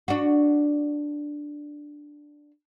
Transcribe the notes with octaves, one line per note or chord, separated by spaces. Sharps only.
D4 F#4